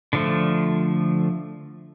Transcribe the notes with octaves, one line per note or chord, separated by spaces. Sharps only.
D3 F3 A3